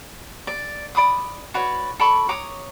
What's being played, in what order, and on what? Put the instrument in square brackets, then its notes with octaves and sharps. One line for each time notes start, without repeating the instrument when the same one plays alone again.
[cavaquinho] D5
D5 B5 D6 D#6
F#4 B4 C#5 D5
A4 D5 B5 C#6
C#5 A#5 D6 D#6